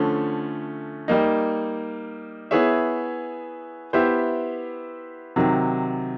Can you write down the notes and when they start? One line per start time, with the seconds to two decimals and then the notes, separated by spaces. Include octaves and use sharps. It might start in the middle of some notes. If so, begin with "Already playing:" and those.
Already playing: D3 F3 A3 C#4
1.08 G3 A#3 D#4
2.51 B3 E4 G#4 C#5 E5
3.93 B3 E4 G4 C5 E5
5.36 C3 D#3 F#3